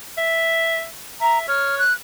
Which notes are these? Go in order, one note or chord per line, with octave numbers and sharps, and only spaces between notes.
E5
E5 A#5
C#5 F6
F#6